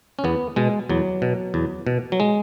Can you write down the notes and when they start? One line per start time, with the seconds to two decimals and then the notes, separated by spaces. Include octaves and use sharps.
0.19 C#4
0.24 E2 B3
0.56 B2 G#3
0.89 E2 F#3
1.22 B2
1.54 E2
1.87 B2
2.12 F#3
2.20 G#3